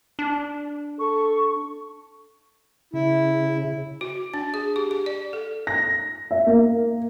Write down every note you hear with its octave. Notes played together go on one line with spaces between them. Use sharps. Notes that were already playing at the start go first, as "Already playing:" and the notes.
D4
A4 C#6
C#3 E4
F#4
D4
G#4
G4
G4
D5
A4
A#6
E5
A#3